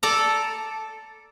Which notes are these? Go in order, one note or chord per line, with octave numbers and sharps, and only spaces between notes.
A4 D5 A#5